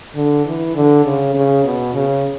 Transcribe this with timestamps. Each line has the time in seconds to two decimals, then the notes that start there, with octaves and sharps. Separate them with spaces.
0.16 D3
0.45 E3
0.75 D3
1.05 C#3
1.35 C#3
1.64 B2
1.94 C#3